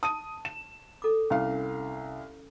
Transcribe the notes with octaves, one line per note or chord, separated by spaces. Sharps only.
A5 D#6 D#7
E7
A4 D6
C2 C#4 F5